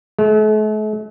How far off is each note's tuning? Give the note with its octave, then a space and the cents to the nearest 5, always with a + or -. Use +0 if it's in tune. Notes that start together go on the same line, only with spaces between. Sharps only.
A3 -45